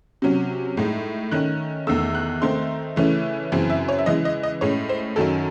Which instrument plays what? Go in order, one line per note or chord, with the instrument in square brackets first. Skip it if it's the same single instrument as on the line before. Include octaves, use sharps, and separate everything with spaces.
[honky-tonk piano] C3 F#3 C#4
A2 G#3 D#4
D#3 A3 C#4 F#6
E2 D#3 A3 E6
F#6
D#3 A3 C4 D#4 C6
C#3 E3 A3 C#4
F#2 C#3 E3 C4
E5
C#5
E5
C#3 E3 G#3 D#5
D#5
D#5
A2 G#3 C#4 C#5
C5
F#2 D#3 F#3 C#4 A4